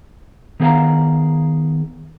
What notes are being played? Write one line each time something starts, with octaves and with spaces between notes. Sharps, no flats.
D#3 B3 G#4 C#5 F5 A#5